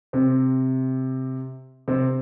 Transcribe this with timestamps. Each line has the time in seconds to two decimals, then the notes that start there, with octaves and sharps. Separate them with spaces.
0.13 C3 C4
1.88 C3 C4